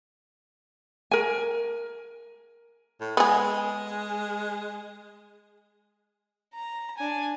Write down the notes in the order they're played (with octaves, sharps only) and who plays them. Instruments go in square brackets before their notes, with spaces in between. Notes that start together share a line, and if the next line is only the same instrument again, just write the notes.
[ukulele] A#4 G#5
[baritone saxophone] A2
[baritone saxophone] G#3 [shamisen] B3 G#4
[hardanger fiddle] A#5
D4 G#5